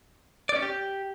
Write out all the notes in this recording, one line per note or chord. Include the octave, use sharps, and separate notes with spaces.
D5
C#4
G4